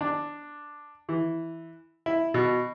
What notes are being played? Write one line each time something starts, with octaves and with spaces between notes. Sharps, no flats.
D4
E3
E4
B2